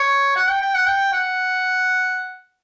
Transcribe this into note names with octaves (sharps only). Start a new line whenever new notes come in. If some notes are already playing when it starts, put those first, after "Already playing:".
Already playing: C#5
F#5
G5
G5
F#5
G5
F#5